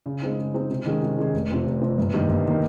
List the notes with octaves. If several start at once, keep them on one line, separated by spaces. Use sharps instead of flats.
C#3
G#3 C4 D#4
C#3
G#3 C4 D#4
C3
D#3 G#3 C#4 G#4
C3
D#3 G#3 C#4 G#4
F1
F2 C3
F1
F2 C3
G1
G2 D#3 A#3
G1
D#3 A#3